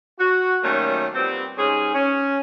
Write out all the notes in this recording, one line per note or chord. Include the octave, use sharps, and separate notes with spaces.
F#4
D#3 F#3 G3 A3 A#3 C#4
A#2 G3 B3 C4
G#2 C#4 G#4
C#4